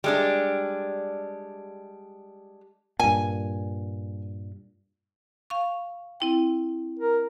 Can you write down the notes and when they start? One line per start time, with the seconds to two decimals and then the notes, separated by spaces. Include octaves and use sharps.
0.04 G3 G#3 D4
3.00 G2 A#2 G#5
5.50 F5 C#6
6.20 C4 E4 G5
6.99 A#4